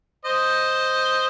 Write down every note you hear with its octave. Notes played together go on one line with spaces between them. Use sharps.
C5 D#5